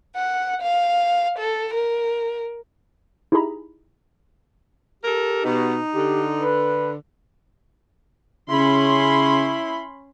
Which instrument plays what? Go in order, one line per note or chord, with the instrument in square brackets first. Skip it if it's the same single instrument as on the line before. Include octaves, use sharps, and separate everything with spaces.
[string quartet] F#5
F5
A4
A#4
[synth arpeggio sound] D#4 E4 G4 G#4 A#5 B5
[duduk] G4 [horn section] A4 A#4
[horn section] B2 [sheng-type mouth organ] D#4
[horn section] D3 [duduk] G4
[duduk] B4
[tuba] C#3 [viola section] C#4 B5 C6 [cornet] E4